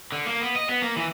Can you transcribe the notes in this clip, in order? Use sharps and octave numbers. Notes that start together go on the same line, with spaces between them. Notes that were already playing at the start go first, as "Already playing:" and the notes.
D3
A#3
B3
D#5
B3
A#3
E3